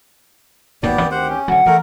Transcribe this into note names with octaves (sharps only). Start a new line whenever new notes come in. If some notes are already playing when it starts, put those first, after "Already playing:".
G#1 D#2 B2 B3 G4 D5
D2 D#3 C4
G4 C5 F#5
C#4
D3 F#3 F#5
E3 A3 A#4